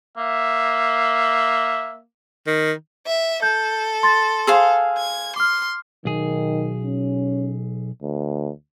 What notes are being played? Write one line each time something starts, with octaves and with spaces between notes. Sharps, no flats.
A#3 E5
D#3
E5
A4 G6
C6 A6
G#4 C5 F5 E6
G#6
C6 D6 F6
B1 D#3 G#4
C#4
D2